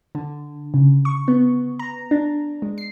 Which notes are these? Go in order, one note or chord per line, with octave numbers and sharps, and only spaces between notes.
D3
C#3
C#6
B3
A#5
D4
G#3
C7